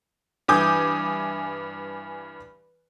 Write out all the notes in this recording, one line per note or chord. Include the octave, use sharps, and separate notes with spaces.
G2 E3 G#5 D6 D#6 G6